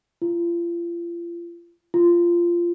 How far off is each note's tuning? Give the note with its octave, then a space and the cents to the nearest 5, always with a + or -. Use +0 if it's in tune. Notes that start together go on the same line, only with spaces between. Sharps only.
F4 -35
F4 -15